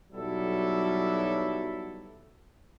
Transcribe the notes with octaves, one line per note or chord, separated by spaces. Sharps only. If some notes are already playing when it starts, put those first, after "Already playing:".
B1 F#3 G3 E4 A4